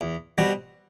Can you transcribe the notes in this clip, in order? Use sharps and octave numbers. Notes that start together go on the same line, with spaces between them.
E2
B2 G3 C4 F#4